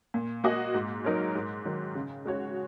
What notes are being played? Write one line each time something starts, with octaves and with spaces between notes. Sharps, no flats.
A#2
A#3 F#4 D#5
G#2
F#3 D#4 A#4 C#5
G#2
D#3 F#3
C#3
G#3 F#4 C#5